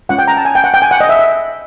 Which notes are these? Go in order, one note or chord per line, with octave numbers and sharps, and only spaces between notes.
G#3 C#4 F4 F#5
G5
A#5
A5
G#5
G5
F#5
G5
G#5
F#5
D#5
E5
E5